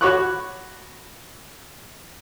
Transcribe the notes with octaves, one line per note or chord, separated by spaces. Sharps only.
F#4 C#5 B5 C#6 D6 F#6